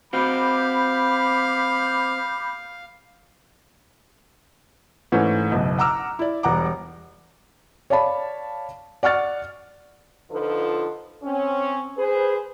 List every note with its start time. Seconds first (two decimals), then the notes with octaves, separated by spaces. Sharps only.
0.13 C4 F#4 F5 B5 D6 G6
5.12 G#2 E3 A3 C#4
5.52 F#1 B1
5.79 F#5 A#5 D6 E6 F6
6.19 E4 D5
6.43 E1 G3 F#5 A#5 D6
7.90 C#5 D5 F5 A5 B5
9.03 D5 F#5 C#6 F6 A6
10.31 D3 F3 D#4 F4 A4 B4
11.24 C4 C#4
11.98 G#4 B4 C5